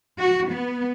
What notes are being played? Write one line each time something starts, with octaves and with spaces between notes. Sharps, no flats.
F#4
B3